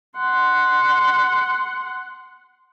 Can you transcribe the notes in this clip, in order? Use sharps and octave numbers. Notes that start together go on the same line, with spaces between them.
F#5 C6